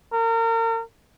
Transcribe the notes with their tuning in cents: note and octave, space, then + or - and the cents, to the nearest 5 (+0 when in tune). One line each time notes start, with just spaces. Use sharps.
A#4 -35